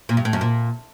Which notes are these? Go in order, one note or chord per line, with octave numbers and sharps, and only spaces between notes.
A#2
G2
A2
F#2
A#2